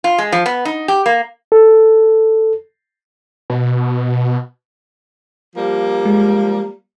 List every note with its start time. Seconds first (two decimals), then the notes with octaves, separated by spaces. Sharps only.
0.04 F4
0.18 G#3
0.32 F3
0.46 B3
0.65 D#4
0.88 G4
1.06 A#3
1.52 A4
3.50 B2
5.55 F3 G3 A#3
6.05 G#3